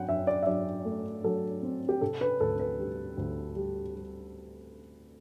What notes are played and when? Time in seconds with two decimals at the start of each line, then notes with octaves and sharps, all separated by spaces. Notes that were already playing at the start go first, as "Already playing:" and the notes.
Already playing: F#3 C4 F#5 G5
0.08 F#2 E5
0.27 D5
0.43 E5
0.47 F#3 D5
0.85 A3
1.24 F#3 A4
1.63 C4
1.89 G4
2.01 C3 A4
2.21 B4
2.40 D2 A4
2.59 B4
2.79 G3
3.17 D2
3.56 G3
3.95 G3